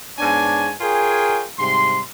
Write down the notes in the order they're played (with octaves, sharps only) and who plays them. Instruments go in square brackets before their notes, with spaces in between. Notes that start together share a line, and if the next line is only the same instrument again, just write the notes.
[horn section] G#2 B3 D4 C#5 G#5
F4 G#4 A#4 C#5 G5 G#5
G#2 C3 G3 C6